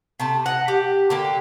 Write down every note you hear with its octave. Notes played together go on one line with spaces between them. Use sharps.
C3 A3 A5
D#5 F#5
G4
D3 A#3 G4